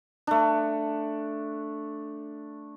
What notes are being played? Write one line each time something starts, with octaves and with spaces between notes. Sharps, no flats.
A3 D4